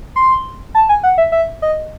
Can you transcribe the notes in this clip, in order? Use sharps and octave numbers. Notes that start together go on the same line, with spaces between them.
C6
A5
G#5
F#5
E5
E5
D#5